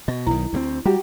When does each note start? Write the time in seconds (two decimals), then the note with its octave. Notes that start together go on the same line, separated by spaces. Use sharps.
0.08 B2 D#5
0.27 B1 D#3 E4
0.53 D2 D#3 C4
0.85 G3 F#4 G4 A#5